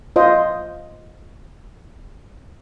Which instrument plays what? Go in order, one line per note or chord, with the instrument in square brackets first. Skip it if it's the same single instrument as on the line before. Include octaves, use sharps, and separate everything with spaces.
[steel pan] F4 C5 D#5